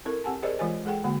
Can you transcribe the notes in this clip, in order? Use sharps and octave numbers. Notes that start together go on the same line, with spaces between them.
C4 E4 A4 A#4
C4 G4 F#5 G#5 A5
G4 G#4 A#4 C5 D5 D#5
E3 G#3 F4 C5 D#5 G#5
G#3 G#4 A4 F#5 G5
D3 G#3 A#3 F#4 F#5